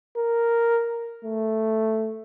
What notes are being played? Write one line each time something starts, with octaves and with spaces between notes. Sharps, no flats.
A#4
A3